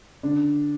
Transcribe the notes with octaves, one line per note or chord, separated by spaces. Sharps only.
D3 D4